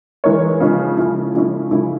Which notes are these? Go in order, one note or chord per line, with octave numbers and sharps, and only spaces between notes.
E3 G#3 E4 A#4 C#5
C#3 F3 G#3 C#4 E4
C#3 F3 G#3 C#4 E4
C#3 F3 G#3 C#4 E4
C#3 F3 G#3 C#4 E4